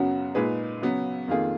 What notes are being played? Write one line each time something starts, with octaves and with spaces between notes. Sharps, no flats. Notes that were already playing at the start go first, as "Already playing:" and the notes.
Already playing: F#2 C#3 F#3 B3 F#4
A#2 G#3 D#4 G#4 B4
C#3 F#3 B3
F2 D#3 A#3 F4 G#4